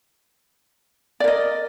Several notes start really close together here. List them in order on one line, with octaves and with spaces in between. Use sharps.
D5 A#4 D#5